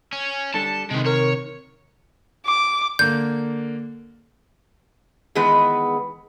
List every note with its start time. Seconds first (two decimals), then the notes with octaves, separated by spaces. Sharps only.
0.13 C#4
0.54 G3 D4 A4 A5
0.91 C3 D#3 G#3 B3
1.06 A#4 C#5
2.46 D6
2.99 D3 A#3 G6
5.35 D#3 E3 G#3 B3 G#4 B4